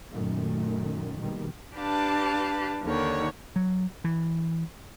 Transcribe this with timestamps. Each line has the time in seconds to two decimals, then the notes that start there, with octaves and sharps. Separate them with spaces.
0.12 F#2 A#2 D#3 A3
1.18 A#1 B2 D#3 G3
1.76 D4 G4 B4 F5 A5
2.83 D#2 D3 D#3 C#5
3.56 F#3
4.04 E3